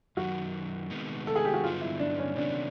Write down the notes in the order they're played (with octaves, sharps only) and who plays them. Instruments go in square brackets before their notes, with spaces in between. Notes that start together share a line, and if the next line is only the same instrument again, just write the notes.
[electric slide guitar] F#2 D#3 F#3 [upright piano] F#4
[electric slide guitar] C3 D#3 G#3 B3
[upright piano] A4
G#4
G4
F#4
[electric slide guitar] G2 D3 F#3 B3 D#4 [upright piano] F4
[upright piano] E4
D4
C#4
[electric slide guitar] C3 D#3 F#3 B3 [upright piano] D4